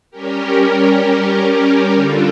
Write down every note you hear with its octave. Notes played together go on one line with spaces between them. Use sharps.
G3 C#4 G4 A#4
D3 G3 D4 F4 A4